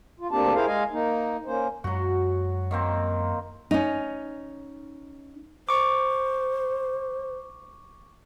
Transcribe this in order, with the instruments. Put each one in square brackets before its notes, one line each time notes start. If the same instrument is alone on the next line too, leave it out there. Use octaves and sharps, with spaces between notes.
[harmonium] F4
D2 A#3 C4 D4 G4 A5
E4 G#4 A#4 C5 F5
G#3 D#5 F5 G#5
A#3 D#4
A#3 C#4 C5
[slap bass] F#2 G#3 [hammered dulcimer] F#3 F#4
[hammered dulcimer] D#3 A#3 C4
[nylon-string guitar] C#4 D#4
[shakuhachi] C5 [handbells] C#6 D6